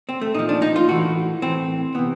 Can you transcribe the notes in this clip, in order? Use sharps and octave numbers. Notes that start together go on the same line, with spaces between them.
C4
A3
A#2 F3 D#4
D4
D#4
F4
A2 E3 F#4
A2 E3 C4
C3 E3 B3